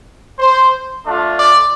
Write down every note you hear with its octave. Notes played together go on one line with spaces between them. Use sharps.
C5
A3 D4 F4
D5